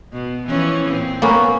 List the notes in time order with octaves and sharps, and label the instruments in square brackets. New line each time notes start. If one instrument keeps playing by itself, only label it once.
[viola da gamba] B2
E3 F3 C#4
A#2 C4
[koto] A#3 B3 C#4